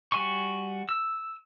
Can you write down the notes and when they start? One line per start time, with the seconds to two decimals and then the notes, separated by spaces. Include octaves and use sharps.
0.12 G3 F#4 G#5 C6 C#6
0.89 E6